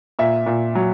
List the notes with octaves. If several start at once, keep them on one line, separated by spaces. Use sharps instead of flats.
A#2 E5
A#2
F#3